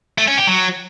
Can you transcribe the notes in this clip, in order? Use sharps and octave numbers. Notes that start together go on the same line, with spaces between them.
A3
C#4
G4
F#3